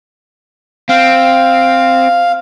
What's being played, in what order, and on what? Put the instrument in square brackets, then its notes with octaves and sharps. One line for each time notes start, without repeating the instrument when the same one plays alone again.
[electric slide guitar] C4 [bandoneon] F5